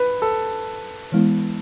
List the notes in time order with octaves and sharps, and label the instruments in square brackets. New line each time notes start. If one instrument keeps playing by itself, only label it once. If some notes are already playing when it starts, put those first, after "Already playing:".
Already playing: [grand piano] B4
A4
[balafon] E3 G#3 B3 E4